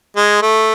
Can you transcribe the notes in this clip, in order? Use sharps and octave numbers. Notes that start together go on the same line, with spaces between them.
G#3
A3